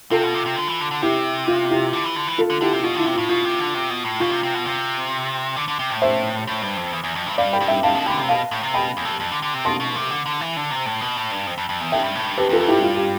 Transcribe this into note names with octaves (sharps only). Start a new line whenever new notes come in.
C3 F4 A4
B2
C3
C3
D3
E3
D3
D3
C3 E4 G4
F4
E4 G4
D3
E3
D3
E3
F4 A4
D3
D3 E4 G4
C3
B2 F4
D3 E4
C3
A2 F4
B2 F4
C3
D3
C3
B2
A2
B2 F4
C3
C3
B2
C3
D3
D3
C3
A2
C5 E5
A2
G2
F2
E2
E2
F2
G2
G2 D5 F5
G5 B5
G2
E5 G5
G2 F5 A5
B2
D3 G5 B5
C3
B2 F5 A5
A2
C3
B2 G5 B5
E2
F2
F2
D3
D3
C3
B2 A5 C6
B2
C3
D3
D3
E3
D3
C3
A2
B2
A2
G2
F2
F2
F2
E2
F2 E5 G5
G2
A2
G2
F2 G4 B4
E2 F4 A4
F2
G2 E4 G4
F4
G4